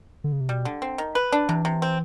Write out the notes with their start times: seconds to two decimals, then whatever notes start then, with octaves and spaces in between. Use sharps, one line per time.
0.24 D3
0.32 C#3
0.41 C3
0.49 B2 G3
0.65 D3
0.82 C4
0.98 D#3
1.15 B4
1.32 D4
1.49 C3 E3
1.65 C3
1.82 C4